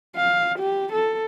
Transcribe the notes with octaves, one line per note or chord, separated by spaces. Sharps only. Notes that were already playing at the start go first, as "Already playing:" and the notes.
F5
G4
A4